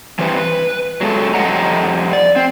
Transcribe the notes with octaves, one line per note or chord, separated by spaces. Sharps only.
E3 G3 C4 B4
B4
F#3 G#3 A4
F2 G3 A4 D#5 F#5 A#5
D5
C4